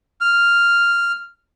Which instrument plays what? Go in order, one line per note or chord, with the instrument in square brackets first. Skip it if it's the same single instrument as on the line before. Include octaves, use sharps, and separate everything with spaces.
[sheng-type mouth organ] F6